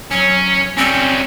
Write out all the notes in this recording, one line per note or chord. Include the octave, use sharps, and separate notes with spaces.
F#3 C#4
G3 C4 C#4